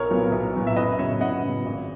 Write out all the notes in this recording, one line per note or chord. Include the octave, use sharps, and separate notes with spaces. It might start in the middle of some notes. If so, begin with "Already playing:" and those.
Already playing: B1 A#4 C#5
A#2 F#3 B3
B1
A#2 F#3 B3
E5
F#2 B4 D#5
C#3 F#3 B3 C#5 E5
F#2 D#5 F#5
C#3 F#3 B3
G#1